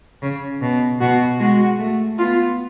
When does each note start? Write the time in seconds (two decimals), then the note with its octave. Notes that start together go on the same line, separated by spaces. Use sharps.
0.22 C#3
0.62 B2
1.01 B2 F#4
1.40 G#3 F#4
1.79 A3
2.18 B3 F4